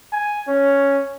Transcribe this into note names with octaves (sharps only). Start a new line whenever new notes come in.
G#5
C#4